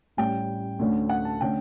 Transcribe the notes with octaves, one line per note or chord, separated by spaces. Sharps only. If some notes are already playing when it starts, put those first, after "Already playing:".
A1 A2 G3 C#4 G5
D2 D3 A3 C#4
F#5
A5
D3 A3 C#4 G5